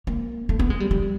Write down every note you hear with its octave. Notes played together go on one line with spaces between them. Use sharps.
A#3
A3
B3
G#3
G3
G3